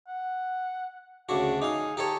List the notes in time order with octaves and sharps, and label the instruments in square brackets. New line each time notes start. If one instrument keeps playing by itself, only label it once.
[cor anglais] F#5
[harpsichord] D2 C#3 F#4 [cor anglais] D4
[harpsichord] D#4 F5 [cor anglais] G#4
[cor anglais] D#4 [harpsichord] G4 A4 C#5